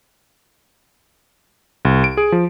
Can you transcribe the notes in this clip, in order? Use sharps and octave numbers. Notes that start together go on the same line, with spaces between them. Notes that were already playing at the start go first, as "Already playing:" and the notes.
C2
D7
G#4
F3